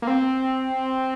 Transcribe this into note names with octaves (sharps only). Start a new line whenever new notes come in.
A#3
C4